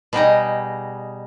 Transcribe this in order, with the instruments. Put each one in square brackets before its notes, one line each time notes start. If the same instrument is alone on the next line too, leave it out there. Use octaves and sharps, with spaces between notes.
[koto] B2 G3 D#4 G#4